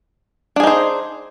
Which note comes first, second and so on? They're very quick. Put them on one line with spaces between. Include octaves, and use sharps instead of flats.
D4 G#4 D#4 C5